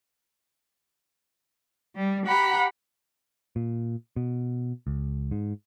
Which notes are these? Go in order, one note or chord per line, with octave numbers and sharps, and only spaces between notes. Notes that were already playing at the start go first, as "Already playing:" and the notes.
G3
G4 F#5 A#5 B5
A#2
B2
C#2
G#2